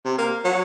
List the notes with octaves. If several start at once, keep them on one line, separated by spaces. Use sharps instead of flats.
C3
A#3
F#3